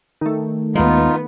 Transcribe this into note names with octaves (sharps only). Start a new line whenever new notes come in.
D#3 A3
D#2 G#3 B3 D#4 F4